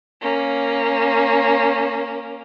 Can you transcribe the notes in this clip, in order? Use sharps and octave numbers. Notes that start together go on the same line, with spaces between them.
A#3 C#4